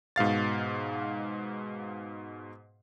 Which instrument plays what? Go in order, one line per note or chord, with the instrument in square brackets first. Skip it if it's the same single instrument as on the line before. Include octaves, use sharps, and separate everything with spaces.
[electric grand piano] G#2 B2 F5 A6